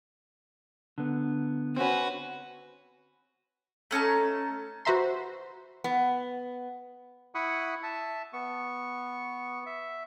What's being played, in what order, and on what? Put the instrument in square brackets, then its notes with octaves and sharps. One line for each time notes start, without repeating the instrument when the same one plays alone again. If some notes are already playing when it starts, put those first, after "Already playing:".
[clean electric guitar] D3 B3
[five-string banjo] C4 C#4 [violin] F#4 B4
[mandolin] A3 C#4 D#4 A5
[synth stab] F#4 B4 C5 E5 A#5 C6
[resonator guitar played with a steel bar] B3
[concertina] E4 F#5 B5 C#6 D#6
E5 A5
B3 C#6
E5